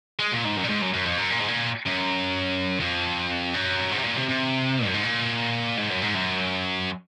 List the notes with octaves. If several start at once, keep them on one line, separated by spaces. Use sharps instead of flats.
G#3
A#2
G#2
F#2
A#2
G#2
F#2
F#2
F2
F#2
A#2
G#2
A#2
F#2
F2
F#2
G#2
C3
A#2
C3
C3
F#2
G#2
A#2
G#2
F#2
G#2
F#2